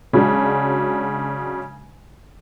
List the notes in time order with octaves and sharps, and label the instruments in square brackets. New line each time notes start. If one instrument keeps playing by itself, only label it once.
[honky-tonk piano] C#3 F#3 G#3 D4